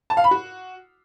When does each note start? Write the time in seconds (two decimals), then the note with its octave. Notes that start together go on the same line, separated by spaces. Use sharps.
0.10 A5
0.17 F5
0.24 B5
0.31 F#4